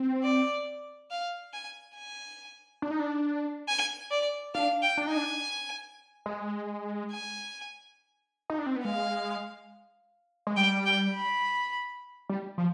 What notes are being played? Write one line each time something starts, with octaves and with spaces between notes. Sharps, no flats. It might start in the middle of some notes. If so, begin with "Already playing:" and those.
Already playing: C4
D5
F5
G#5
G#5
D4
D#4
D4
G#5
D5
D4 F5
G5
D4
D#4 G#5
D4
G#3
G#5
D#4
D4
C4
B3
G#3 F5
G#3
G3 G5
G5
B5
G3
F3